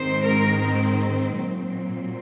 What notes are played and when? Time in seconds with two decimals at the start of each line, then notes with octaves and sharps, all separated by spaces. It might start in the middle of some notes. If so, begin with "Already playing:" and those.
Already playing: G#2 D#3 G#3 C4 C5
0.24 A#4
0.60 C4
1.34 A#2 F#3 C4